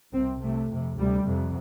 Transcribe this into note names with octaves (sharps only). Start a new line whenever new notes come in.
C2 C3 C4
C2 C3 A3
F2 C3
D2 C3 G3
F2 C3